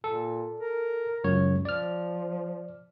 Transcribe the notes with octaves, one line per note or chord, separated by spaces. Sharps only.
A#2 A4
A#4
C#2 F#2 C#5
F3 D5 F6